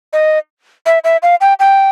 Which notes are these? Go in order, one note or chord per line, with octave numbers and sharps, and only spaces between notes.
D#5
E5
E5
F5
G5
G5